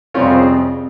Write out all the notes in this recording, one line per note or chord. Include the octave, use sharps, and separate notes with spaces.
F2 C3 G3 C4 C#4 F4
G#4 C5